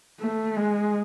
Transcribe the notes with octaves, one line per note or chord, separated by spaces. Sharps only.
A3
G#3